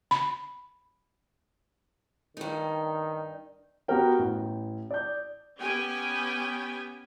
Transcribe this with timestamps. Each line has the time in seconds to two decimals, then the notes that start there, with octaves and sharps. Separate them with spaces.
0.11 B5
2.37 G2 D#3 D#4
3.88 B3 F#4 G4 A#4 G5
4.19 A1
4.91 D5 G6
5.59 B3 C#4 G4 G5 G#5